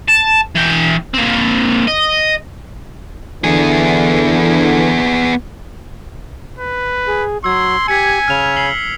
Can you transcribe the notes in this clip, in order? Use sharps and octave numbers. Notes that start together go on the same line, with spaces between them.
A5
E3 G5
A#3 C4
D#5
D3 E3 B3 G#4
B4
G#4
F#3 C6 E6 G#6
G4 G#5 G#6 B6 C#7
C#3 F6 F7
C7 F#7 G7